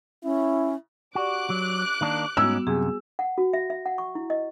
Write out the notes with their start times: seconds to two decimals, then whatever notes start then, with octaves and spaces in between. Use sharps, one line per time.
0.24 C#4 E4
1.15 F#4 G4 D5 C#6 D6 F#6
1.50 F#3
2.01 D#3 A#3 D4
2.37 G#2 G3 B3 C#4 D#4 F#4 E6
2.67 F#2 C3 G#4 G#5
3.19 F#5
3.38 F#4
3.53 E5
3.70 E5
3.86 F#5
3.98 C#6
4.15 E4
4.30 D#5